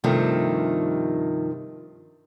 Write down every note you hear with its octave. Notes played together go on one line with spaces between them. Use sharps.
G2 C3 D#3 F3 A3